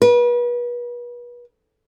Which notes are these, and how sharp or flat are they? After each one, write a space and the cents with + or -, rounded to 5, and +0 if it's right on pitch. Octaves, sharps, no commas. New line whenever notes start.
B4 -35